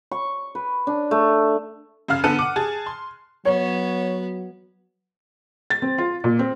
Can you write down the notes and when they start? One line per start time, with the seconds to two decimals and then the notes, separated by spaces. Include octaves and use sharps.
0.11 C#6
0.55 B4
0.87 D4
1.11 A3
2.08 F#2 C#3 F5 F6
2.24 D3 B3 A4 F#6 C#7 D#7
2.39 F#5 D6
2.56 G#4 A5
2.86 C6
3.45 F#3 B3 C#5
5.70 A6
5.82 C4
5.98 F4
6.24 A#2
6.39 C4